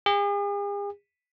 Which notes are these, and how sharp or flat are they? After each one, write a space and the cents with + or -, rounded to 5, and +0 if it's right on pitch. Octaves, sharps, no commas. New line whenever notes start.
G#4 -45